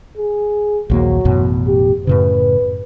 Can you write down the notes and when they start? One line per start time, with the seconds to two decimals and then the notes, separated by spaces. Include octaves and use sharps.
0.17 G#4
0.90 A#1 D#2 F#3 A#3
1.25 A1 F#2 B2
1.68 G4
2.07 F#2 A2 C#3 B4